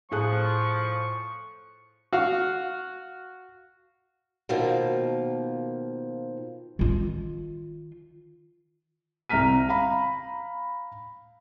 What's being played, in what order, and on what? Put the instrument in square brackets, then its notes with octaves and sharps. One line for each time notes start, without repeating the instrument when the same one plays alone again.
[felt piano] A2 G#4 F#6 [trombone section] F3 [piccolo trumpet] C#6
[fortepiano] F#4 F5
[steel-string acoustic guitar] B2 D#3 F3 A#3
[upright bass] D#3 F4
[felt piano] C2 A#5 F6 B6 D#7
F5 A#5 B5